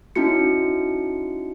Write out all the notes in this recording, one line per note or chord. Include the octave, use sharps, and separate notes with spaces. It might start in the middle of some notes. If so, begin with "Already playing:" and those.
C#4 D#4 E4 F#4 C#7